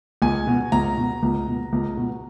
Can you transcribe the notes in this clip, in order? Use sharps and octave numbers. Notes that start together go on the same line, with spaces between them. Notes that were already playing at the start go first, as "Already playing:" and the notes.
C#2 G#5
B2
C#2 A#5
B2
C#2
B2
C#2
B2